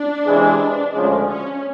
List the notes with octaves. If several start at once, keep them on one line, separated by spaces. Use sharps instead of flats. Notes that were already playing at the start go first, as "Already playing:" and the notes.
Already playing: D4
C3 E3 G#3
D2 C#3 F3 G#3 D4
C#4